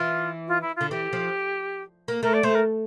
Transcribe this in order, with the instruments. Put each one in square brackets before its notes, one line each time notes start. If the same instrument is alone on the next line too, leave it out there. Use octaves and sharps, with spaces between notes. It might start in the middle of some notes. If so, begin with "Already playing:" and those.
Already playing: [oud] E3 [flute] F4
[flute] F4
E4
[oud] D3 [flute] F4
[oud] E3 [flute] G4
[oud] F3
A#3
[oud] A3 [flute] A#4
[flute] D5
[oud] A3 [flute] C5
[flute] A#4